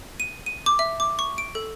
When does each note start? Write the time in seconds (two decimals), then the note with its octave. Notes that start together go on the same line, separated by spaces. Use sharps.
0.20 D#7
0.46 D#7
0.66 D6
0.79 E5
1.00 D6
1.19 C#6
1.38 D7
1.55 A4